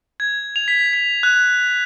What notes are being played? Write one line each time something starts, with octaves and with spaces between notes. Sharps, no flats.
G#6
F7
B6
B6
F#6